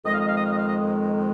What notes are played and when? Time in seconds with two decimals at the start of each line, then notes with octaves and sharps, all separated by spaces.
0.04 F2 D#3 G#3 D#5
0.12 F5
0.19 D#5
0.27 F5
0.35 D#5
0.43 F5
0.50 D#5
0.58 F5
0.66 D#5